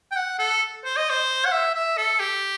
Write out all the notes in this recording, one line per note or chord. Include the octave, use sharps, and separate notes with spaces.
G5
F#5
A4
C5
D#5
C5
F#5
E5
E5
A4
G4